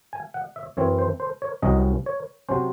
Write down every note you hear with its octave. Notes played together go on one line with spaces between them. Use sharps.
G#5
F#5
E5
F#2 E3 C4 C#5
C5
C5
C#5
C2 C3 F#3 C#4 D#5
C#5
C3 F#3 C#4 C5